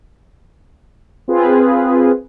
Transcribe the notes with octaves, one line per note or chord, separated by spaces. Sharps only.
C4 F4 G#4 B4